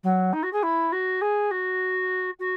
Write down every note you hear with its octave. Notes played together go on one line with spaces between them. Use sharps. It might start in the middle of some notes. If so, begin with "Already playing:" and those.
F#3
D#4
F#4
G#4
E4
F#4
G#4
F#4
F#4